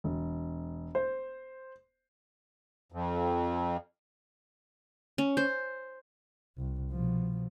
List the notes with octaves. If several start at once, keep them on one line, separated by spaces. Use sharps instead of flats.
E1
C5
F2
C#4
C5
C2
B2 F3